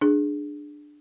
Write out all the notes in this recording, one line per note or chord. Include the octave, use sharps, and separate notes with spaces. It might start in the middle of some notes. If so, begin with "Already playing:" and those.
D4 G#4